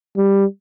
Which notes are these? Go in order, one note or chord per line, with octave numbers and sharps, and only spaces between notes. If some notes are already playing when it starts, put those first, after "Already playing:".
G3